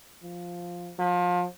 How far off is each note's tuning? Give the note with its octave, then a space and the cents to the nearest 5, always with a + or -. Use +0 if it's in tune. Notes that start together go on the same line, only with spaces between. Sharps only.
F3 +5
F3 +30